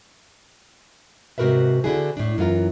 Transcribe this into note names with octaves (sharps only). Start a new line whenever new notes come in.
G#2 C3 F#4 A#4 B4 E5
D3 C4 D4 E4 F#4 G#4
A2 D4
F#2 E3 F4 A#4